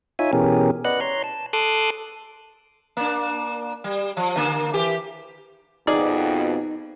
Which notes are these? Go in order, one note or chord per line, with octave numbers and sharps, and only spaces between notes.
D#4 F4 C#5 E5 G#5
B2 E3 C#4 G4 G#4 A#4
B4 D5 D#5 F#5 F#6
C#5 A#5 C6
A5
A4 A5 C6 D6 D#6 F#6
A#3 D4
G3
F3
D3 A#3
E3 G4
F2 B2 D#4 G#4 D5